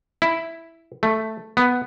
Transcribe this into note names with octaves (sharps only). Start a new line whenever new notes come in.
E4
A3
B3